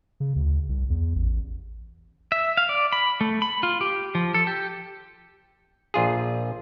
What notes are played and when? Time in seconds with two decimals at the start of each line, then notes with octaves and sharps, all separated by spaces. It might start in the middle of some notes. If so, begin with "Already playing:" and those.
0.20 C#3
0.36 D2
0.69 C2
0.90 E2
1.16 A1
2.32 E5
2.57 F5
2.69 D5
2.93 B5
3.21 A3
3.42 B5
3.63 F4
3.81 G4
4.15 F3
4.34 A4
4.47 G4
5.94 A#1 F4 G#4